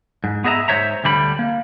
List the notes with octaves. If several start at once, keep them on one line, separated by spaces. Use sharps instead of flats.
G#2
B3 G#4 D#5 E5 A#5
G#2 G#3 C5 C#5 E5 A#5
D2 D3 G3 B5
A#3